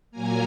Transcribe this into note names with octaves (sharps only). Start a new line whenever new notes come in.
A#2 F#3 A#3 G#5 A#5